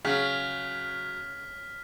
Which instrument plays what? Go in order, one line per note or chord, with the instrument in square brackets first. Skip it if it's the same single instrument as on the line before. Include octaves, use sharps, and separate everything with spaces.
[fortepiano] C#3 [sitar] F#3 [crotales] F6 B6